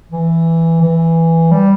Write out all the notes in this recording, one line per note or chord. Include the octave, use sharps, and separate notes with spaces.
E3
E3
G3